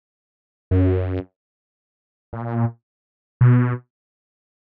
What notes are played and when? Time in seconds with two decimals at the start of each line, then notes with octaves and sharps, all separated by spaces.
0.71 F#2
2.33 A#2
3.41 B2